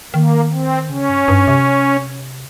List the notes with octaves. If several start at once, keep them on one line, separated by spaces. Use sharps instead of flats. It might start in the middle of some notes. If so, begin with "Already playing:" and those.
D#3 A#3
C4
C#3 C#4
G2
G2
C3